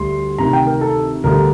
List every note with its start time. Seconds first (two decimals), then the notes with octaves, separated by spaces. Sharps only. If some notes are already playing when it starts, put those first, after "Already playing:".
Already playing: D2 D3 G3 C6
0.38 D2 C3 D#3 A#5
0.53 G5
0.67 A#4
0.81 A4
1.24 D2 D3 G3 A#4